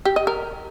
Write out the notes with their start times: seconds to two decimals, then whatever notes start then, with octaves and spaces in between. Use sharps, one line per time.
0.05 G4
0.16 D#5
0.27 A#4